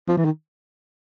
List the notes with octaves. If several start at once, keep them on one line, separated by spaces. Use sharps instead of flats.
F3
E3
D#3